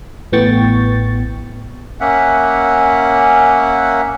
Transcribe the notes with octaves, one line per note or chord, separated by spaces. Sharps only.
A1 A2 B3 G5 C#6 A6
A#3 C#4 E5 F#5